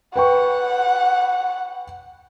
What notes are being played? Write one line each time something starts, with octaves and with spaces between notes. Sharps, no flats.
B4 F#5 G5 C#6